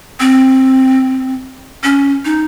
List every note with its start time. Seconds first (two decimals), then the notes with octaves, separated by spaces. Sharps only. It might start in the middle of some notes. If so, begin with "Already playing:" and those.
0.20 C4
1.83 C#4
2.25 D#4